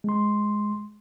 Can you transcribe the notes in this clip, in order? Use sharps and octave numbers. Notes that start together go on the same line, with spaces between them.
G#3 C6